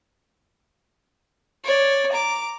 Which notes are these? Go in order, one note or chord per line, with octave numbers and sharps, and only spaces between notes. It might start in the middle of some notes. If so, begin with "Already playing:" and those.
C#5 D5
A#5 D6